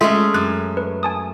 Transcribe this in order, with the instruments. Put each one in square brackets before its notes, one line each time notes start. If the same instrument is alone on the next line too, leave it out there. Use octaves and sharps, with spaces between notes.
[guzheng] G#3 A3 C#4 [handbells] F4 A4 E5
[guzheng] F#2 [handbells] F#6
[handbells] B4
G#5 A5 D#6